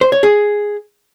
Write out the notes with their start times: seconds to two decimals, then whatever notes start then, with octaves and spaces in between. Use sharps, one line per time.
0.01 C5
0.12 C#5
0.23 G#4